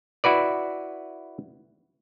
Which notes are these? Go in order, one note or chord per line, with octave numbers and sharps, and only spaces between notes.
E4 F#4 B4 D5